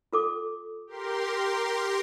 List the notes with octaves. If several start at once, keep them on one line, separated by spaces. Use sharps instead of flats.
F4 A4 D6
G4 A#4 C6